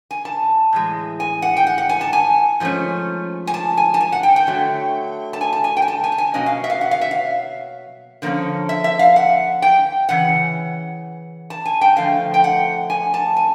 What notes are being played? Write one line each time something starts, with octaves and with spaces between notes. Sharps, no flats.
G#5
A5
A2 E3 G#3
G#5
F#5
G5
F#5
F#5
G#5
A5
G#5
G#2 F3 A3 C#4
G#5
A5
G#5
A5
G#5
F#5
G5
G5
D3 F#3 A3
A5
G#5
A5
G#5
G5
G#5
A5
G#5
A5
G#5
B2 F#3 A#3 C#4 D#5
F5
E5
F5
F#5
F5
E5
F5
D3 F3 A#3 C#4
E5
E5
F5
F#5
G5
C#3 E3 F#5
A5
G#5
G5
D3 F3 A3 F5
G5
F#5
G#5
A5
G#5